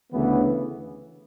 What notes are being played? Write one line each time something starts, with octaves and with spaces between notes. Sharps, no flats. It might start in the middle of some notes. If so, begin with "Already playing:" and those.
D2 C#3 E3 B3